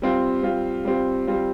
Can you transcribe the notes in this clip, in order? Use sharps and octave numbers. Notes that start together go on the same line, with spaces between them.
G3 C4 F4
G3 C4 F4
G3 C4 F4
G3 C4 F4